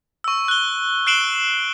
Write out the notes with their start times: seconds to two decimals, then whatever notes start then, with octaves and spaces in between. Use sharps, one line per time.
0.24 C#6 E6
0.48 F#6 G7
1.07 F#6 C7 D7 E7 F#7 G7